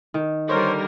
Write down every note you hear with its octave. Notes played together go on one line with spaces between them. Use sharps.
D#3
D3 G3 A#4 C5 C#5